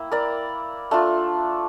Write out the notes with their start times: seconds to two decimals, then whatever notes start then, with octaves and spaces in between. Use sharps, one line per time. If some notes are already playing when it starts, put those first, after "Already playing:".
Already playing: A#3 E4 E5 G5
0.12 A#4 D5
0.91 A3 D4 F4